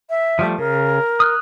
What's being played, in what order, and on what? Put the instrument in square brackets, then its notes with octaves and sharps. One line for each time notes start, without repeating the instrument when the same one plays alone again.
[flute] E5
[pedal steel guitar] F3 G3 A3
[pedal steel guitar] C#3 [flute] A#4
[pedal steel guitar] D#6 F6 F#6